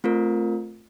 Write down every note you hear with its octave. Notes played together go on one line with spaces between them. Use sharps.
A3 C4 F4 A#4